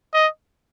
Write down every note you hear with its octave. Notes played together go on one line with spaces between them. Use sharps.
D#5